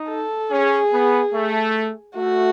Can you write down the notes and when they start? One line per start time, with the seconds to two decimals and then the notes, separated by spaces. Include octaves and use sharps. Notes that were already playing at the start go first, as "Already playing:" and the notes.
Already playing: D#4
0.09 A4
0.51 C#4 G#4
0.92 B3
1.34 A3
2.16 A3 F#4